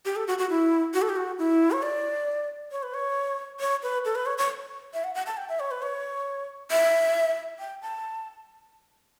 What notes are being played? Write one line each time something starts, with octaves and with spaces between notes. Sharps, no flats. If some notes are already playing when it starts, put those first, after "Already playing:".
G4
A4
F#4
F#4
E4
F#4
A4
G4
F#4
E4
C#5
D5
C#5
B4
C#5
C#5
B4
A4
B4
C#5
C#5
E5
F#5
F#5
A5
G5
E5
C#5
B4
C#5
E5
G5
A5